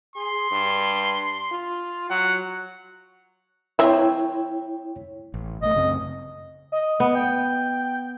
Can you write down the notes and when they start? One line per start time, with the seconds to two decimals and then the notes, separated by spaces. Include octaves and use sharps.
0.16 G#4 C6
0.51 G2
1.52 F4
2.10 F#3 F#5
3.79 F3 C4 E4 C#5 E5 G5
5.34 A1
5.62 A#1 A3 D#5
5.74 F#2 C#3 C4
6.72 D#5
7.00 B3
7.15 G5